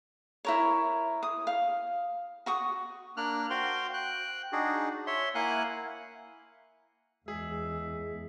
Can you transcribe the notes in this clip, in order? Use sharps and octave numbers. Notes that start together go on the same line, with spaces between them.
E4 A#4 C#5
D#6
F5
F#4 C#6 D#6
A#3 D4 F6 F#6
F#4 C5 F5 G5 C6
G5 F#6
D4 D#4 F#4 G#4
C#5 E5 C6
A#3 E4 F5 F#5 G#5 F#6
E2 G#3 G#4 E5